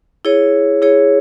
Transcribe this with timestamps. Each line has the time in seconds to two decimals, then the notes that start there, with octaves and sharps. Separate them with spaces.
0.25 E4 G#4 C#5
0.82 E4 G#4 C#5